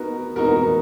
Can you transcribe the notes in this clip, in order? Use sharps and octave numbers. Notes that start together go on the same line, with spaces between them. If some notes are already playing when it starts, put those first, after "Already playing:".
Already playing: B3 D#4 F#4 A#4
B3 D#4 F#4 A#4